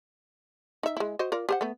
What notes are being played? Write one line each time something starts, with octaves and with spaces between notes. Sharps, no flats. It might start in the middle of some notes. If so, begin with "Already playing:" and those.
D#4 E5
G#3 E4
F#4 C5 D#5
F4 A#4 D5
G4 C5 F#5
A3 B3